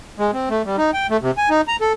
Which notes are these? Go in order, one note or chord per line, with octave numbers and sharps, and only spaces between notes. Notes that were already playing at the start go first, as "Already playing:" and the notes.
G#3
C4
A3
G3
D#4
G5
A3
C3
G#5
D#4
A#5
A4